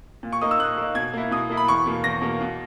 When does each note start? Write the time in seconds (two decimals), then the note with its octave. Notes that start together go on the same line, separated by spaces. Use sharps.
0.23 A#2
0.32 C#6
0.42 A#3 D#4 D#6
0.51 E6
0.59 A#2 F#6
0.77 A#3 D#4
0.95 B2 G#6
1.13 A#3 E4
1.31 B2 D#6
1.50 A#3 E4
1.57 B5
1.68 E2 C#6
1.86 B2 A#3
2.04 E2 A#6
2.22 B2 A#3
2.41 B2